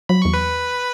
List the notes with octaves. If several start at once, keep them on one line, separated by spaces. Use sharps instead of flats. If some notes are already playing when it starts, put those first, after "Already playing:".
F#3 B5
E2 C#6
B4 B5